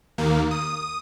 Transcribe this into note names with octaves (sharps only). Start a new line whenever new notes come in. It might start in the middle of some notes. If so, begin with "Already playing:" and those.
D#2 A#3
D#6